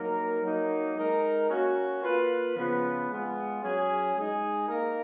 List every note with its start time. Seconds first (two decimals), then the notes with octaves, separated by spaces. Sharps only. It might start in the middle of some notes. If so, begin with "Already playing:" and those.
Already playing: F#3 A#3 D#4 A#4
0.42 F#3 A#3 D#4 A#4
0.96 G#3 D#4 A#4
1.49 A#3 C#4 F#4
2.02 A#3 F4 B4
2.56 C#3 F3 B3 F4 B4
3.09 G#3 B3 F4
3.62 F#3 C#4 G#4
4.14 G#3 D#4 G#4
4.68 A#3 D#4 A#4